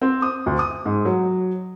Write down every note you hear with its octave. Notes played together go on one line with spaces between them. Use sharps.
C4
D#6
D2
D#6
G#2
F#3